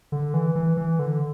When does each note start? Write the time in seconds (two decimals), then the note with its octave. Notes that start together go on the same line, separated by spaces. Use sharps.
0.12 D3
0.34 E3
0.55 E3
0.77 E3
0.99 D3